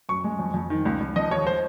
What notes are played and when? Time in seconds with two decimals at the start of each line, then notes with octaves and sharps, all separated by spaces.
0.09 F#2 C#6
0.24 G#3
0.39 F2
0.54 F2
0.70 D#3
0.85 C#2
1.00 C#2
1.16 F3 D#5
1.31 D#2 C#5
1.47 C5